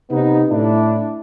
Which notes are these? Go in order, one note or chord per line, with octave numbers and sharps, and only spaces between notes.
C3 B3 D#4
A2 D4 E4